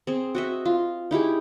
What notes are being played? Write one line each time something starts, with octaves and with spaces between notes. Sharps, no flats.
C4 G#4
F#4 D#5 E5
F4
D#4 E4 G4 G#4